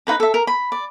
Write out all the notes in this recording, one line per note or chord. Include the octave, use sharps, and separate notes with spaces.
D#4 F4 B4 A#5
A4 E5
A#4
B5
D5